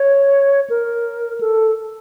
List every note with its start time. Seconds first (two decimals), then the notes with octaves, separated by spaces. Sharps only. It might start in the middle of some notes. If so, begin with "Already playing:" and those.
Already playing: C#5
0.70 A#4
1.40 A4